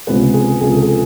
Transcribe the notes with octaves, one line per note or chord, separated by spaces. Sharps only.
C#2 C3 F3 G#3 B3 B4
G#4
C#2 C3 F3 G#3 G#4
A4
G#4